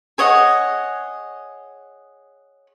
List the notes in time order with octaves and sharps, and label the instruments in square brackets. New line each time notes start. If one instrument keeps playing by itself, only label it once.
[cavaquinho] G#4 C#5 D#5 F#5